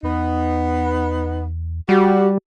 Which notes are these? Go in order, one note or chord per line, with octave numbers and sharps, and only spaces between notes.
E2 B3 D#4
G3 F#4 G4